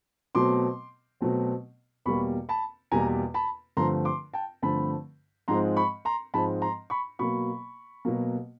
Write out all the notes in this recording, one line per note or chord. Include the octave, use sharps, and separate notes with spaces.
B2 F#3 A3 C4 C6 D6
B2 F#3 A3 C4
E2 B2 G3 A#3 B5 C#6
A5 B5
E2 B2 G3 A#3 G#5 A#5
A5 B5
G2 D3 F3 A3 C4 A#5 C6
C6 D6
G5 A5
G2 D3 F3 A3 C4 A5 B5
G#2 F3 G#3 C4 A#5 C6
B5 C#6
A#5 C6
G#2 F3 G#3 C4 A5 B5
A#5 C6
B5 C#6
B2 F#3 A#3 B5 C#6
B2 F#3 A#3